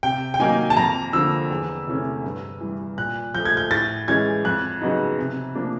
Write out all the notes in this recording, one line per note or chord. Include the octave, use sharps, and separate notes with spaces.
C3 G5
G5
D#3 F#3 A#3 D#4 G#5
A5
F2 A#5
D3 F3 A#3 E6
E2
C3 E3 A3 C#4
G2
E3 G3
A#2 F#6
F3 A3 G6
G#6
G6
A2 A6
E3 G#3 C#4 G#6
F2 F#6
C#3 F#3 B3 D#4
C3
F3 A#3 D4